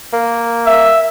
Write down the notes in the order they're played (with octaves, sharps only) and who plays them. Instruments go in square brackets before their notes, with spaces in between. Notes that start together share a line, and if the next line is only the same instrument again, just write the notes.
[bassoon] A#3
[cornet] E5